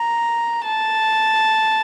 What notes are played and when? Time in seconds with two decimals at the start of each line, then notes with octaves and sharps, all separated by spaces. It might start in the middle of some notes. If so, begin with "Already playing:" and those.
Already playing: A#5
0.65 A5